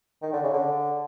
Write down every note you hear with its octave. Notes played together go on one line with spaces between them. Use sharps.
D#3
D3
C#3
D3